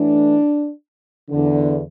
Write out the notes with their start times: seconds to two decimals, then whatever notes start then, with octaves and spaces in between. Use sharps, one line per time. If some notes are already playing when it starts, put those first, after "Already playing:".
Already playing: A2 E3 D4
1.30 E2 D3